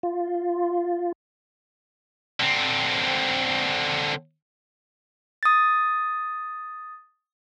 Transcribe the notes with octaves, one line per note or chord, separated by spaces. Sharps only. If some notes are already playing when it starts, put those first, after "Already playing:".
F4
D3 C4
D#6 A6